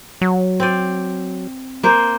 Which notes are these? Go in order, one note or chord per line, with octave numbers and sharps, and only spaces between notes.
F#3
C4 D5
A#3 C5